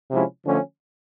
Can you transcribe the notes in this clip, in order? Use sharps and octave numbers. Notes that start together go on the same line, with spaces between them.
C3 F3 G#3 C#4 E4
D3 F3 A3 C#4